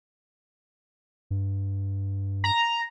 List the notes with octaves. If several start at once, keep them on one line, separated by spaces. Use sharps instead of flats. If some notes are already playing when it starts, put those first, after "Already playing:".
G2
A#5